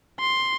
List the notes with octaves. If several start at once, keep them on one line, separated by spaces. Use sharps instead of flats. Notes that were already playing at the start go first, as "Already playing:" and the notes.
C6